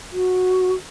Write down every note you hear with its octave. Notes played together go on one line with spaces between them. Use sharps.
F#4